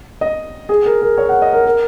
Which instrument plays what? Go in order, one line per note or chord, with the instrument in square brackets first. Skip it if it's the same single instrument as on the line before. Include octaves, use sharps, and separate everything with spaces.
[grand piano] D#5
G#4
A#4
A#4
C#5
F#5
D#5
A#4
A#4